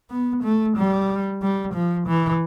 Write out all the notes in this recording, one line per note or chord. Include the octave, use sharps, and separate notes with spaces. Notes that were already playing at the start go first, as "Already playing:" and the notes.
B3
A3
G3
G3
F3
E3